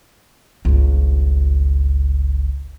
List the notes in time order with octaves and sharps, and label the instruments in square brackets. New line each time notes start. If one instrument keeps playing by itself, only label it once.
[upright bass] G1 C#2